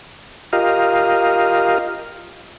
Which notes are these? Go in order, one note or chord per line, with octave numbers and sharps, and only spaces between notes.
F4 G4 A#4 D#5 F5